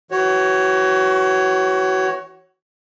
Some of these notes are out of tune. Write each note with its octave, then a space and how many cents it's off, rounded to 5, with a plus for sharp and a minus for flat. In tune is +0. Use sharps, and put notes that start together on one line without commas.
E3 +0 F#4 +30 C#5 +0